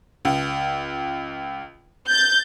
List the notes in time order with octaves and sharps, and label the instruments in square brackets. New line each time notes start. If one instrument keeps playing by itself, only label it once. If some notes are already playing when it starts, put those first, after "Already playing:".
[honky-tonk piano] C#2
[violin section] G6 A6